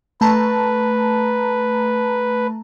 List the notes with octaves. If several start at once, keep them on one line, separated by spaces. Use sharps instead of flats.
A3 B4 A5 A#5